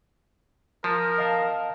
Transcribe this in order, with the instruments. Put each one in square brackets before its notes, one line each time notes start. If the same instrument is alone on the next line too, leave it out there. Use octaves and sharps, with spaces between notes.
[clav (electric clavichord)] F3 [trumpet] A#4
[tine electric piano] D#5 F5 A5